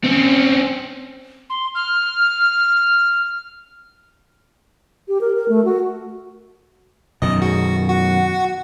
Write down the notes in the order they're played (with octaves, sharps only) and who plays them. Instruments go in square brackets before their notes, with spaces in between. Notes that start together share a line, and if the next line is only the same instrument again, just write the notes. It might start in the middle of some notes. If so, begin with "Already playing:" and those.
[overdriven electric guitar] C4 C#4
[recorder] C6
F6
[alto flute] G4
A#4
A#4
A3
F#4
[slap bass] F#2 B2 D#3 [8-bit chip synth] D#5
[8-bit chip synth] F#4 [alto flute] G#4
[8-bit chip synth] F#4 [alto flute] F#5